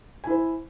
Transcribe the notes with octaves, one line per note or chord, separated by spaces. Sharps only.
E4 C5 G#5